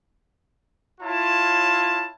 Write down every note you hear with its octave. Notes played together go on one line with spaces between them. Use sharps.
E4 F4 C#5 A5